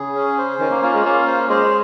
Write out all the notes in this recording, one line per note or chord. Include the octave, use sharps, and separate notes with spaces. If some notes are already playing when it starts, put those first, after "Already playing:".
Already playing: C#3 G#4
C#4
C5
D#3 C#4
A#3
A#3 F4
G#3
A#3 C#4
C5
G#3 C5